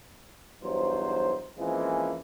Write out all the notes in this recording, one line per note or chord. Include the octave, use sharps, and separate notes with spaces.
E2 G2 F#3 D#4 C5
E3 F3 G#3 A#3 C4 C#4